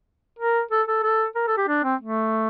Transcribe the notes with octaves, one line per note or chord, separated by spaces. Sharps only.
A#4
A4
A4
A4
A#4
A4
G4
D4
C4
A3